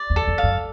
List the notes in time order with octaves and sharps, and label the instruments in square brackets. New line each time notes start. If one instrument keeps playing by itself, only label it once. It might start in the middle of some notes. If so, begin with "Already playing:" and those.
Already playing: [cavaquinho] D5
[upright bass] E2
[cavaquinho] A4
[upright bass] F2
[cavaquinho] F5
[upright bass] F#2